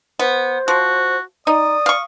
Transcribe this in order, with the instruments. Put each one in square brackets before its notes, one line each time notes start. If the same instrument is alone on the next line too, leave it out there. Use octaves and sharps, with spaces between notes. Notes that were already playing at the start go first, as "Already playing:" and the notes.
[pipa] B3 [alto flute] C5
[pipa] F3 [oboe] F#4
[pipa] D#4 [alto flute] D5 [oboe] D#6
[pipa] F5 C#6